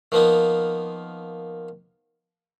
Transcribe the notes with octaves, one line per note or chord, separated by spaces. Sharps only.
D#3 F3 A#3 B3 D#4